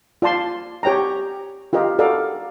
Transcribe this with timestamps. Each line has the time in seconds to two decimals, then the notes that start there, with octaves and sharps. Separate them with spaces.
0.22 F4 D5 A5 C6
0.83 G4 C#5 G5 A5 A#5
1.73 F4 G4 A#4 D#5
1.99 F#4 A4 A#4 D5 F5